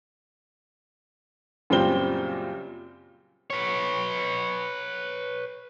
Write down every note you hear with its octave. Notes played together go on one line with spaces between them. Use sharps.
F#2 A#2 C#3 G3 C4 G7
B4 C#5